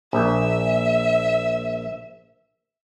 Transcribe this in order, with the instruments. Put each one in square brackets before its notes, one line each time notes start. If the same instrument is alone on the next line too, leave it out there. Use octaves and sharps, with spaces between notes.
[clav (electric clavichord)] A#1 [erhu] E5